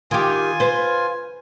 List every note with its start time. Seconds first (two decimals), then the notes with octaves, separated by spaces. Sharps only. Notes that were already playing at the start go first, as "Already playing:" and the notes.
0.11 D#3 F4 G4 G#5
0.60 B4 C5